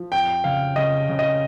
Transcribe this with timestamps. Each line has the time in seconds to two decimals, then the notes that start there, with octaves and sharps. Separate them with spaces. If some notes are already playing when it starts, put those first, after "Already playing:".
Already playing: F3
0.12 F2 G5
0.44 C#3 F5
0.76 C#3 D#5
1.09 C#3
1.19 D#5